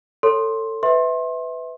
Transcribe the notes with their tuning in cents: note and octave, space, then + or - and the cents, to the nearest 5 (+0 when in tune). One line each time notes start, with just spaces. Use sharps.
A4 +25 C#5 +0 C6 +10
B4 +20 E5 -25 C6 +30